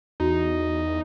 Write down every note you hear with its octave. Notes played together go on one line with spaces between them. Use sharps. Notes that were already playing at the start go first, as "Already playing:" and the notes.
E2 D#4 F#4